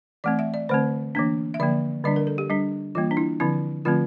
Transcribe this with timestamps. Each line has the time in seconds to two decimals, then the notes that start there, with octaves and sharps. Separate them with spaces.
0.24 E3 A3 C4 D5
0.39 E5
0.54 D5
0.69 D3 A3 C4 C5
1.15 E3 A#3 D4
1.54 E5
1.60 D3 F3 A#3 D5
2.04 D3 G3 D4 D5
2.16 A#4
2.27 A4
2.38 G4
2.50 G3 D4
2.95 E3 G3 A#3 F4
3.11 D4
3.17 E4
3.40 D3 F3 C4 E4
3.85 D3 F3 A3 C4 F4